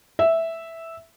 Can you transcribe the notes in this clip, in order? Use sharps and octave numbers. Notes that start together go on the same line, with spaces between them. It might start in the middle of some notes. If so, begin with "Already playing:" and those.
E5